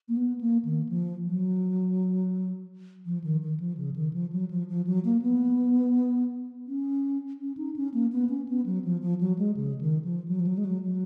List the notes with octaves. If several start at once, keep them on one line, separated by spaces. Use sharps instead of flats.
A#3
B3
A#3
D#3
F3
F#3
F3
D#3
D#3
F3
C#3
D#3
F3
F#3
F3
F3
F#3
A#3
B3
C#4
C#4
D#4
C#4
A#3
B3
C#4
B3
F#3
F3
F3
F#3
G#3
C#3
D#3
F3
F#3
F3
F#3
G#3
F#3
F#3